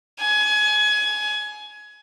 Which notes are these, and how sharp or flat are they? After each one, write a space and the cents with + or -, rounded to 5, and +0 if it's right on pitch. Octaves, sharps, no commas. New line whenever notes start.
G#5 +25